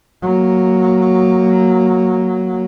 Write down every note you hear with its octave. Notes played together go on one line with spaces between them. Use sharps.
F#3 A#3